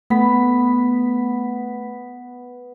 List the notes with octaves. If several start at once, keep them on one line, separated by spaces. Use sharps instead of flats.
A3 B3 B6